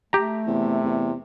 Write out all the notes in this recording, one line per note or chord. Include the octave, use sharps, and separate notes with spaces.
A3 G4 A#5
E2 C3
E2